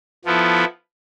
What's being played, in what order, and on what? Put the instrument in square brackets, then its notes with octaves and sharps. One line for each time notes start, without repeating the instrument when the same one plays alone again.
[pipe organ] F3 B3 E4 A4